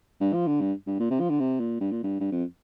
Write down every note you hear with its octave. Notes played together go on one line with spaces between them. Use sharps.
G2
F3
D3
G2
G2
A#2
C3
F3
D3
C3
A#2
G2
A#2
G2
G2
F2